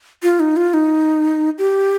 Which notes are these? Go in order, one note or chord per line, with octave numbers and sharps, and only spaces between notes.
F4
D#4
F4
D#4
G4